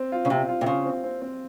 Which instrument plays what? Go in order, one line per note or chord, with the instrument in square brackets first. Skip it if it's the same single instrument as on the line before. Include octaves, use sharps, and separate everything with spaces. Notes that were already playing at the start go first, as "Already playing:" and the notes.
Already playing: [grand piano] C4
F4
[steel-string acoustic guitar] C#3
[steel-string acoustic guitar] C3 [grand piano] F4
[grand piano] F4
[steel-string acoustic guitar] C3
[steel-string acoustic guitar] C#3 [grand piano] F4
[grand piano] C4
C4
C4